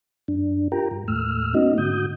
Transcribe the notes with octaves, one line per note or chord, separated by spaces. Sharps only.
F#2 D4
F4 G4 A#4 G5 A#5
G2
D#2 A2 A3 E6 F6
A3 B3 C#4 D#4 F#4 D#5
G#2 D3 F#4 D#6 G6